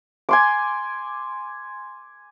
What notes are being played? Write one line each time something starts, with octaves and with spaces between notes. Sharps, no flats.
G#5 C6 D6